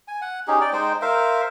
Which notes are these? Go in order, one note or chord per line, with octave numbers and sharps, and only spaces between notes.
G#5
F#5
C#4 D#4 G4 G#4
D5 G5
G#3 D#4 C5 G5
A#4 C5 E5 F5